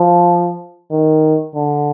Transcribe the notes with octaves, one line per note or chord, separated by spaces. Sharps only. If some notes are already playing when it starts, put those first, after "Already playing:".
Already playing: F3
D#3
D3